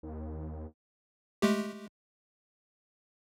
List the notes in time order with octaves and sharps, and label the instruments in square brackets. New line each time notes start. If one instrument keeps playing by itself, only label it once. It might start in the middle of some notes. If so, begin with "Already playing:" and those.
[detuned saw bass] D#2
[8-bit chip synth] G#3 A3 G4